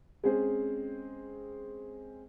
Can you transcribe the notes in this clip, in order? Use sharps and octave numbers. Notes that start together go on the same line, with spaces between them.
G#3 C4 C#4 G#4 C5